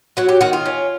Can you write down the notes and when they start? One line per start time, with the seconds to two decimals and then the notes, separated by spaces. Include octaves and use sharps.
0.17 F#3 F#4
0.29 G4
0.41 D#3 F#4
0.53 F4
0.66 C#4